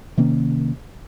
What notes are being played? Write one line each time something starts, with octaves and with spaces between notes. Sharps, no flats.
C3 D#3 A#3 C#4